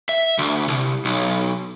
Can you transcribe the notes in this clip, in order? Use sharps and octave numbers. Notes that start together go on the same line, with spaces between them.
E5
D2
C2
B1